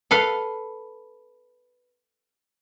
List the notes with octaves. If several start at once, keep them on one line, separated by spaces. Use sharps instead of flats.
A4 B4 F5